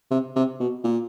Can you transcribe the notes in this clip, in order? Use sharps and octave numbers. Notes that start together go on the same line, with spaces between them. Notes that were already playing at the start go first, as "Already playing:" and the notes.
C3
C3
B2
A#2